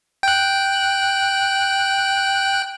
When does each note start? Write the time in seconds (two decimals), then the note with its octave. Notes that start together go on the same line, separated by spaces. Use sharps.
0.23 G5 F#6